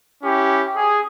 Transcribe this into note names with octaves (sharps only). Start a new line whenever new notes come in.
C#4 E4 G4
G#4